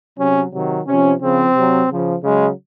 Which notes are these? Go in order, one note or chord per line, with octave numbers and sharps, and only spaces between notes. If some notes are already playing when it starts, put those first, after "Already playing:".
C3 F#3 C#4
C3 D#3 F#3
C3 F3 C#4
C#3 F3 C4
C3 F#3
C#3 F3
C#3 F#3 G#3